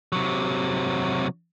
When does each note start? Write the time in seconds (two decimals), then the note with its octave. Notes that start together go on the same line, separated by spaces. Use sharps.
0.12 C3 F#3